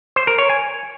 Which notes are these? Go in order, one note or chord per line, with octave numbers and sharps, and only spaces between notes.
C5
A#4
C#5
G#5